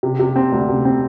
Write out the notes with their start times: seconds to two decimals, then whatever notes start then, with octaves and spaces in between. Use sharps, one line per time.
0.03 C3
0.20 C3
0.36 C4
0.52 D2
0.69 C3
0.85 C4